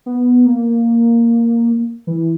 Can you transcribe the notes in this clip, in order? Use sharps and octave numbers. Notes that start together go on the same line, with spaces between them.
B3
A#3
E3